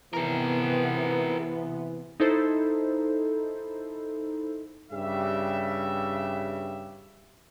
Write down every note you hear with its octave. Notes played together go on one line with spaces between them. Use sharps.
C3 E3 B3 G#4 A#4
D#4 E4 A4 C5
G2 C#3 G3 G4 E5